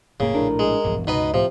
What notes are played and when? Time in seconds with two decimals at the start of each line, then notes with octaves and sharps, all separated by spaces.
0.20 F1 A2 C#3 A#3
0.35 A#1 A2 D4 A#4
0.59 G#3
0.85 E1 A#1 E2 G2
1.07 C#2 B2 D#4 B4 D#5
1.34 A2 C3 F3